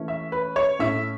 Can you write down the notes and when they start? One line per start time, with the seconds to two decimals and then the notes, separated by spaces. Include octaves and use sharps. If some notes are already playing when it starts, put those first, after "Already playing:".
Already playing: E3 A3 C#4
0.08 E5
0.32 B4
0.56 C#5
0.79 A2 A3 C#4 E5